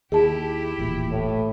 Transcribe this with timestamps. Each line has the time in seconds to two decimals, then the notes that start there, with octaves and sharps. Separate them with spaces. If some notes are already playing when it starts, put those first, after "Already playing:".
0.12 D#2 E4 G4 G#4 A5
0.78 D#1 A1 A#2
1.11 A2